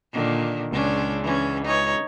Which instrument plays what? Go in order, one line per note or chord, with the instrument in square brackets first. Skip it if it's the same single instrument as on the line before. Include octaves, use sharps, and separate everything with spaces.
[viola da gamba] A#2 D3 D#3
[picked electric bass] C#2 [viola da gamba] C#4 D4
[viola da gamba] E3 C#4
D#4 C#5